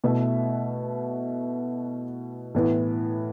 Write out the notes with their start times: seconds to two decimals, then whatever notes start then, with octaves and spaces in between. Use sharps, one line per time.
0.04 B2 A3 E4 B4 E5
2.55 A2 E3 B3